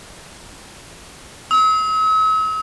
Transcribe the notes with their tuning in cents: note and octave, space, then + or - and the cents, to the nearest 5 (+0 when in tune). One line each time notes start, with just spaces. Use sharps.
E6 -45